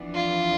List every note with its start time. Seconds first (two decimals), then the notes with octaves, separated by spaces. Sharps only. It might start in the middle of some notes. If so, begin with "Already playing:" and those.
Already playing: F2 E3 B3 D4
0.15 F4